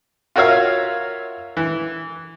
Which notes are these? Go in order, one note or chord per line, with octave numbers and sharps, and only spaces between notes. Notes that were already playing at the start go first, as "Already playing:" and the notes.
F4 F#4 A#4 C#5 E5 F5
E3